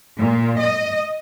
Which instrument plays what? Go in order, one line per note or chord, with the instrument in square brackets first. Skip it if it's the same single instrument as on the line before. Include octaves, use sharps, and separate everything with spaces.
[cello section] A#2
D#5